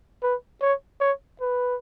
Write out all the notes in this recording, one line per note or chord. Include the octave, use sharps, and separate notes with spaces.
B4
C#5
C#5
B4